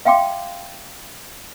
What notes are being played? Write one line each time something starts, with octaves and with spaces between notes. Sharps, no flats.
E5 F5 G5 C6 D6